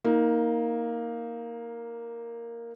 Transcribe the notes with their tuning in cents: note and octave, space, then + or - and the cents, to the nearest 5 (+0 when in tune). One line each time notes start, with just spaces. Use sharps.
A#3 +0 D#4 +20